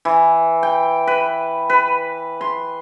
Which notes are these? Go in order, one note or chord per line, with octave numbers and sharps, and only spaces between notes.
E3
G5
B4
B4
C6